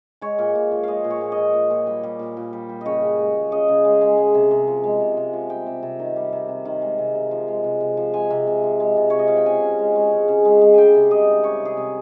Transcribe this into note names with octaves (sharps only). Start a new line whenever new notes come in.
G#3 C#5
A#2
A#2
F3
G#3 D#5 F5
A#2
C#5
A#2
D#5
F3
A#2
A#2
G3
G3
A#2
A#2
G3
G3
C#3 C#5 D#5
C#3
G#3
G#3
C#3 D#5
C#3
G#3
G#3
G#3
C3
C3
F3
G#3
C3
C3
F3
G3 G5
C3
C3
D#3
G3
C3
C3
D#3
G#3
C3
C3
F3
G#3
C3
C3
F3
G#3 G#5
C3
C3
F3
G#3
C3
C3 C#5
D#5
F3 F5
G5
C#3 G#5
C#3
G#3
G#3
C#3
C#3
G#3
G#3
G3 G5 G#5
C3
C3 D#5
D#3
G3 C#5
C3
G#4
C3